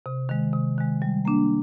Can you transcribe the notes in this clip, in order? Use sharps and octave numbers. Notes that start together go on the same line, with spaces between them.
C3
D#3 G#3
C3
D#3 G#3
G3
A#3 D4